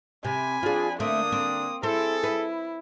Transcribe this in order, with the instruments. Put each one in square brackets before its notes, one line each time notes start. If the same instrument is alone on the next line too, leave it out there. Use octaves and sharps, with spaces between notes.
[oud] C3 [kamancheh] G#5 B5
[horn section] F3 C4 D4 [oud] F4 G#4
[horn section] D3 D4 [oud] A3 C4 [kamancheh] A#3 D#6
[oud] C4
[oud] C4 [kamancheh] E4 [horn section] G#4 A4
[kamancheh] E4 [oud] B4